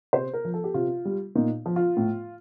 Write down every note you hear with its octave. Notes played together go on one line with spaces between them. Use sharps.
C3 C5
A#4
F3
A4
G4
C3 F4
G3
A#2 D#4
F3
F4
A2